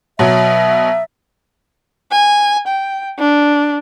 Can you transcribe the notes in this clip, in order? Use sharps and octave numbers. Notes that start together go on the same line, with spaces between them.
B2 F#3 E5
G#5
G5
D4